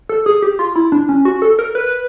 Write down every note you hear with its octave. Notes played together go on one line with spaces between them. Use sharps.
A4
G#4
G4
F4
E4
D4
C#4
F#4
A4
A#4
B4